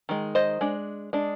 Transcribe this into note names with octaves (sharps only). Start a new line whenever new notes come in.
D#3 G#3
C5 D#5
G#3 D4
G#3 D4